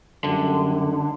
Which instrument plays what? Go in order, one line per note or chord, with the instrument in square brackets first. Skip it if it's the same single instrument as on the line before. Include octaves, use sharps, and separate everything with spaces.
[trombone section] F#2 G3 A3 [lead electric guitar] D3